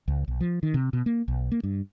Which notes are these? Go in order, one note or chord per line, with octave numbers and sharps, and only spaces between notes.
C#2
B1
F3
D#3
C3
B2
A#3
B1
A#3
G2